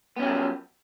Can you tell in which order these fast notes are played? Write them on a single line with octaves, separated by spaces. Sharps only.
B3 C#4 G4 F3 F#3